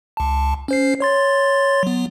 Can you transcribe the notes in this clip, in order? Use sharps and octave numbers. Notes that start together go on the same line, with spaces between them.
C#2 A5
C#4 C5 C7
C#5 C6 A6
F#3 B3